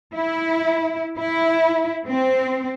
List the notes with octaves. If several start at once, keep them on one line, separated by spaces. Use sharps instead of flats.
E4
E4
C4